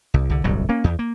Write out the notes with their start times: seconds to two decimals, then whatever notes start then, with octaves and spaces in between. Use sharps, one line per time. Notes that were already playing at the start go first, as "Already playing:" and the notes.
0.14 C2
0.30 C2 D3
0.44 D1 G1 C2 F#3
0.69 A#3 C#4
0.84 E2
0.99 A#3